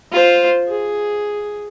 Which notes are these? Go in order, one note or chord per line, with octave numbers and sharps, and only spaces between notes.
F4 C5
G#4